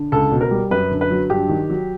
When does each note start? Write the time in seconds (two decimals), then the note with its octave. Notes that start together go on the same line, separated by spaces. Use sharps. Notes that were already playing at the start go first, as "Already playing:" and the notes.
Already playing: D3
0.12 C#2 A4
0.31 B2
0.41 A#4
0.51 G3
0.71 F#2 B4
0.91 D3
1.01 B4
1.11 F#3
1.30 G2 G4
1.49 D#3
1.70 F#3